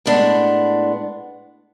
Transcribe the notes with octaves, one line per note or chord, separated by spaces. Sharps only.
A2 G#3 B3 D4